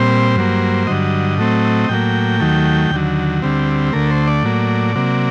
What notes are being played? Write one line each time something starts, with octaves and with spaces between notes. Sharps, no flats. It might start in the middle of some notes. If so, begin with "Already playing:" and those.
Already playing: A#2 G3 C4 C5
G2 F#3 A#3
G2 D3 F#3 D#5
A2 F#3 A3 C4
A2 F#3 A#3 G5
D#2 D#3 F#3 A3
D#2 D3 F#3
D2 D3 G3 C4
D2 D3 A3 A#4
C5
D5
A2 F#3 A#3
C3 F#3 A#3